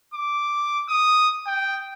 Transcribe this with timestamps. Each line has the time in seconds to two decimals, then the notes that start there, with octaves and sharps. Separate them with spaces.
0.14 D6
0.89 D#6
1.47 G5